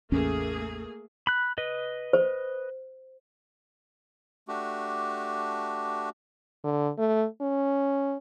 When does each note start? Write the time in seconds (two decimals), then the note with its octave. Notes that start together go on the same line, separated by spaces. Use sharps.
0.12 A1 E2 A3 A#3 C#4 G#4
1.27 B5 F#6
1.58 B4 D#5
2.13 C5
4.48 A3 D4 F#4 G4
6.64 D3
6.98 A3
7.41 C#4